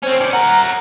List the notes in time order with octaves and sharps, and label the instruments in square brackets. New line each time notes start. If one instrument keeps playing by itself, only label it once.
[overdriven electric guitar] C4 C#4 [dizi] C5
[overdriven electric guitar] C#4 D5
[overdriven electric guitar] A#4 F#5 [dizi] A#5